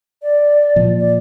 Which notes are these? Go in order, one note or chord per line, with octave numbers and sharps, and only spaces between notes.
D5
A#2 F3
D5